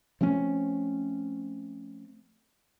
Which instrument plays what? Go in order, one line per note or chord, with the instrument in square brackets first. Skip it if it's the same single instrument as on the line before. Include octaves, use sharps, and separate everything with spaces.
[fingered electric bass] F3 A3 C4 C#4